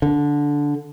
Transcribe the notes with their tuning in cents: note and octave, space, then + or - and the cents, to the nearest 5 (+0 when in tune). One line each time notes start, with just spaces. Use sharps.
D3 -10